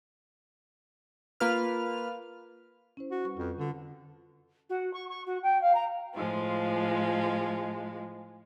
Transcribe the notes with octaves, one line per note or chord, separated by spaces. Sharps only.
A#3 F4 B4 F6
C#4 E4 C5
F#4
G3 B4 C#6
F2 F4 B4
D3 C#4 F4 A4
F#4
C#6
C#6
F#4
G5
F5
A#5
A2 F3 G#3 F4